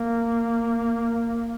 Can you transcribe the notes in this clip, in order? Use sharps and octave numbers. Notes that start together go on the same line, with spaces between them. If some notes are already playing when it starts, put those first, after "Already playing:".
Already playing: A#3